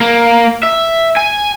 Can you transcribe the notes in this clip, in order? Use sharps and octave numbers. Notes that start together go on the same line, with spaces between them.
A#3
E5
G#5